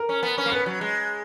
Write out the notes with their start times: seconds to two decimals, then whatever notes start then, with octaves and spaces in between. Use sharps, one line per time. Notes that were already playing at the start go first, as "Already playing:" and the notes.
Already playing: A#4
0.09 C#4
0.23 B3
0.38 C#4
0.46 A#3
0.52 B3 B4
0.66 F#3
0.81 G#3